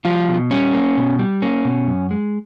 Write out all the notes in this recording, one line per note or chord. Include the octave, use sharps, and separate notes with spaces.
F3 G3 F4
B2
G3 C#4
A#3
B2
G3
A#3 C#4
B2
F#2
G#3